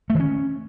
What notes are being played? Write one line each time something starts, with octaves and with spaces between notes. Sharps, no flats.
A3
D#3
C#4